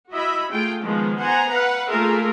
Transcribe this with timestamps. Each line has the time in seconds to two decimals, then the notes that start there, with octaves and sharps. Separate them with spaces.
0.11 E4 F#4 D#5 E5 B5
0.51 A3 F4 G#4 G5
0.82 D#3 F3 G#3 B3
1.18 B3 C5 F#5 G#5 A#5
1.51 B4 F5 F#5
1.88 A3 A#3 F4 G#4 A#4 E5